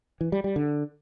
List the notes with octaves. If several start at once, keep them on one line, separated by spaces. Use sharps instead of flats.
E3
G3
G3
D3